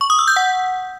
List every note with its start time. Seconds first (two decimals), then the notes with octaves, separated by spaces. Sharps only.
0.01 C#6
0.10 D#6
0.19 E6
0.28 G6
0.36 F#5